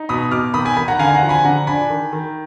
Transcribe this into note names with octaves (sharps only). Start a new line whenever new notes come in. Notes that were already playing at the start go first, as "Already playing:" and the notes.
Already playing: D#4
B2 B5 D#6
B2 D6 F6
D#3 B5 D#6
G#5 B5
D#3 G#5 B5
F#5 A#5
D3 F5 G#5
G#5
F#5 A#5
F3
G#5 B5
D3 F#5 A#5
D4 G#5 B5
D#3
D#3